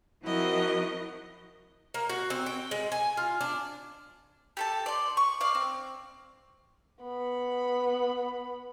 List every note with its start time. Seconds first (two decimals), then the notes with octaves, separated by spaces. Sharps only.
0.23 F3 C4 E4 F#4 A#4 D#5
1.94 A#3
2.09 F#4
2.30 C4
2.46 G5
2.71 G#3
2.92 G#5
3.17 F4
3.41 D4
4.57 G4 A4 A5
4.86 D5 C6
5.17 C#6
5.41 D5 F5
5.55 C4
7.03 B3 B5